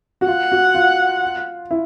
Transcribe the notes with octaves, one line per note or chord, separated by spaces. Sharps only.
F#4
F4 F#5
F#4
F4
E4